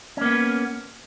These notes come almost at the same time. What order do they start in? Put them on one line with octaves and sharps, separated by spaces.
C#4 A#3 B3